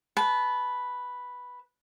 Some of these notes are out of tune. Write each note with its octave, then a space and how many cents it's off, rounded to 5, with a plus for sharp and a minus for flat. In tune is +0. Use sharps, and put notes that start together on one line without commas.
B4 +0 A5 -30